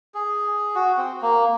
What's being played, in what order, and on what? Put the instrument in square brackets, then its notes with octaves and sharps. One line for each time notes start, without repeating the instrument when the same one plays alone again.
[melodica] G#4
F#4
C4
A#3